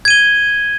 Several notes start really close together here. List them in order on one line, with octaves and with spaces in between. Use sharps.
G#6 D#7 G7